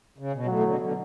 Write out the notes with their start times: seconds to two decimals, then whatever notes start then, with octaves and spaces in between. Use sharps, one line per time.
0.18 C#3
0.33 B2
0.46 A2 F#3
0.59 E3
0.64 B2 D3
0.80 B2 D3